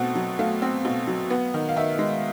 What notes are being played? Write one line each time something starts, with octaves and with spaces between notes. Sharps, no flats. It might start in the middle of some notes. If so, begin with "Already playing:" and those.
Already playing: B2 A3 C4 F#5
F#3
A3 F5
C4
B2
F#3
B3
D#3
F5
D#3 E5
G#3